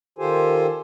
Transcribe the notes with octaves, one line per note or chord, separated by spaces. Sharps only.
D#3 F4 G4 A4 C5 G#5